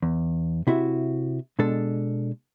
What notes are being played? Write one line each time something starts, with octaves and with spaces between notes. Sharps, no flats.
E2
C3 E4 F#4 E5
B2 G#3 D4 A4